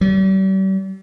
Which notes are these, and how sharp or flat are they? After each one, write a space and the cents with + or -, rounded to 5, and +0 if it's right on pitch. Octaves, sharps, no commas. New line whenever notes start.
G3 -40